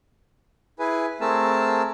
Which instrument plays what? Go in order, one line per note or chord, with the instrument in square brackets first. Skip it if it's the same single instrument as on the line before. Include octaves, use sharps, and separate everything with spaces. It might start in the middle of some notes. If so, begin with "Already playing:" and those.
[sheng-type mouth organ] E4 G#4 B4 G#5
A3 C4 G#4 A#4 A5 E6